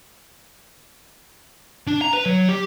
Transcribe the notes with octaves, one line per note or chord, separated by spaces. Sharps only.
D4
A#5
B4
F#3
G4